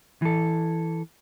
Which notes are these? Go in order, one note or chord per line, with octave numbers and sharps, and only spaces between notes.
E3 A4